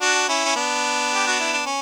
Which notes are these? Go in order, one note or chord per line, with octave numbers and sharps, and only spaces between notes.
D4 F#4
C#4 E4
C#4
B3 D4
G4
F#4
E4
D4
C#4